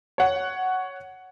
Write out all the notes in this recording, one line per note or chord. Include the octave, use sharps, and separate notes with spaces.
C#5 F#5